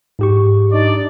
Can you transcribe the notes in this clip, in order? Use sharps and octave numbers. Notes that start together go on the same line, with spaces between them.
G#2 G4 C#6
D4 D#4 D5